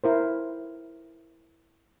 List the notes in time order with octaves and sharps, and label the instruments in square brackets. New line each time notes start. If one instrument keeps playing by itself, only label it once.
[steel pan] E4 A#4 C5